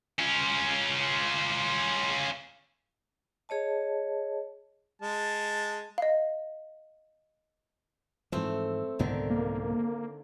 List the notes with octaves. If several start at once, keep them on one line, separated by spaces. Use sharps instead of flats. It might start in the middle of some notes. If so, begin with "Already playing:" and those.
C#4 F4
G#4 C#5 D#5 A5
G#3 A5
D#5 F5
G#2 E3 F3 A3 C4
C2 G#2 D3 D#3 B3
A#3